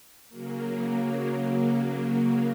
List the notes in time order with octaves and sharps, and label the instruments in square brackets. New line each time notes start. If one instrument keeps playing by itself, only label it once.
[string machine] C#3 F#3 A#3